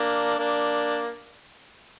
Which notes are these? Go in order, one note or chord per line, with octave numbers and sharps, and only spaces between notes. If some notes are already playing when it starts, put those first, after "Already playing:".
Already playing: A#3 D4
A#3 D4